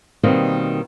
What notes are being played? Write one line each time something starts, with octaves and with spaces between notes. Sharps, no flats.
B2 D#3 G3 A#3 C4